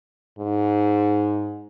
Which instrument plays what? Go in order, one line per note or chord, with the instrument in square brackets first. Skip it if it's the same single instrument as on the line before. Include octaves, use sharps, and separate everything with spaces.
[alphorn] G#2